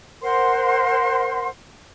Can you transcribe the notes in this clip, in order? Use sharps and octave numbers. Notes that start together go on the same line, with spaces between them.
A#4 C5 F#5 C6